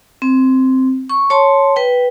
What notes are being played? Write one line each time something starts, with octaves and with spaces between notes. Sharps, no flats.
C4
C#6
C#5 A5 C6
B4 G5